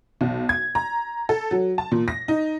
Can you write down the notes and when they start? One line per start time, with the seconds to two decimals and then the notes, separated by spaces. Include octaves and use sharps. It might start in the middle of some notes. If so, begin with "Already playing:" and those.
0.21 B1
0.49 G#6
0.75 A#5
1.29 A4
1.51 F#3
1.78 A5
1.92 A#2
2.08 A#6
2.28 D#4